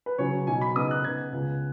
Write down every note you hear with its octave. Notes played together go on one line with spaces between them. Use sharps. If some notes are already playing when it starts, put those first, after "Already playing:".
B4
C#3 F#3 C#4 C#5
B2 F#3 D#4 G#5
B5
C#3 B3 D#4 D#6
F#6
C#3 B3 D#4 G#6
C#2 C#3 B3